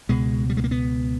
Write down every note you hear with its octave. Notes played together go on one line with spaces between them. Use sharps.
C#2 B2 G#3
G3
G#3
A#3
B3